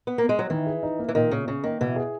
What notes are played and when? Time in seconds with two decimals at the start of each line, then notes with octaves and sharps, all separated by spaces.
0.07 B3
0.18 A#3
0.29 G#3
0.39 F#3
0.50 D#3 E3
0.66 G#4
0.83 D#4
0.99 A#3
1.09 E3
1.15 A#2 D#3
1.31 A#2 C#3
1.47 C#3 C#4
1.64 D#3 A#3
1.81 B2 E3
1.96 G#4